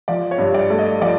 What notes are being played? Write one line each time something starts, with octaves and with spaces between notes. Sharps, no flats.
F3 D5
C#5
G2
D5
A3
D#5
F3 D5